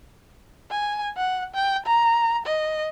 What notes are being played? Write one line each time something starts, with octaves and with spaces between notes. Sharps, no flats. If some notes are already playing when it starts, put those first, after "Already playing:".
G#5
F#5
G5
A#5
D#5